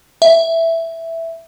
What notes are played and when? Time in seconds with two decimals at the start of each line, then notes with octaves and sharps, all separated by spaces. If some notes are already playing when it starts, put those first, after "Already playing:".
0.22 E5